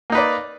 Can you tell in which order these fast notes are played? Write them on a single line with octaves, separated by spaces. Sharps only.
A#3 D#4 B4 D5